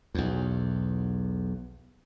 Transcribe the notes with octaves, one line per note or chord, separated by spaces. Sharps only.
B1 E2